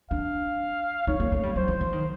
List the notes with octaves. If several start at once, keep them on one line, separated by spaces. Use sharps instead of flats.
D4 F5
D#4 C#5
A#3
A3
G3
F#3 C5
E3
F3
D#3